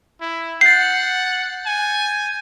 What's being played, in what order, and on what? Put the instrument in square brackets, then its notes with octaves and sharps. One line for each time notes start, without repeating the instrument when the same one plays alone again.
[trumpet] E4
[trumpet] F#5 [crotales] G6 A6 [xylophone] C7
[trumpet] G#5